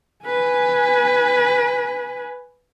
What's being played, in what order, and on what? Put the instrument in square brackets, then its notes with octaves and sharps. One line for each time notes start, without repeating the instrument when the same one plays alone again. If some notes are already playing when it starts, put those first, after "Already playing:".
[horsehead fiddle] B4 G#5